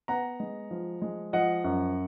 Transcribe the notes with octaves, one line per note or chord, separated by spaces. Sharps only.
B3 F#5 A#5
G#3
F3
G#3
F3 D#5 F#5
F#2